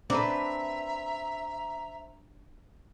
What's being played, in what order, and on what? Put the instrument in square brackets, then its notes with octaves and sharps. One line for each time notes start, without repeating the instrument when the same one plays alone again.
[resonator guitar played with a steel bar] C4 B4 [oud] D4 [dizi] E5 [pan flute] A#5